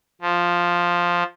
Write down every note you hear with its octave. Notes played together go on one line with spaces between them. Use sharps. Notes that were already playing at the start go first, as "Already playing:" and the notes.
F3